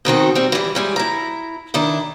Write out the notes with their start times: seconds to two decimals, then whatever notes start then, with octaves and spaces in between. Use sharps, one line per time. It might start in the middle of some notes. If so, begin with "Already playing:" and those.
0.05 B2 D#3 C4 F#4
0.35 G3 C4
0.52 E3 G3
0.75 E3 G3 G#3
0.96 E4 A#5
1.74 D#3 D4 E4